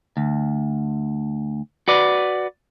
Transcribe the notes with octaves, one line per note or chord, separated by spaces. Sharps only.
D2
F#4 B4 D5